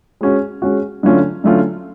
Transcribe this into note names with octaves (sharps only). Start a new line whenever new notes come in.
G#3 C#4 F#4
G#3 C#4 F#4
D3 F#3 A3 C#4 F4
D3 F#3 A3 C#4 F4